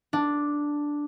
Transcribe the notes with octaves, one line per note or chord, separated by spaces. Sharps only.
D4